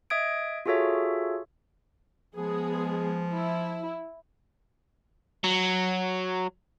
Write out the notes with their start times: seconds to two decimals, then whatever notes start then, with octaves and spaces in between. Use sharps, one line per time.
0.10 D#5 E5 D#6 G#6 D7
0.66 F4 F#4 G#4 A4 C#5 E5
2.36 F3 G#3 B3 G#4
3.33 E4
5.44 F#3